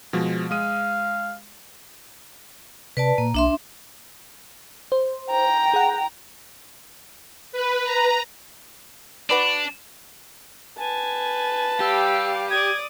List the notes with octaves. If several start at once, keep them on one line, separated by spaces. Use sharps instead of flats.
B2 F3 G#3
G#3 F5 D#6 D#7
C3 B4 D5 A5
A#2 A#3
B1 D4 E5 C6
C5
G5 A#5
G#4 F#5
B4
A#5
D4 F#4 B4 D5
B4 G#5 A5
G3 G4 F5 E6
D5 D#6 G#6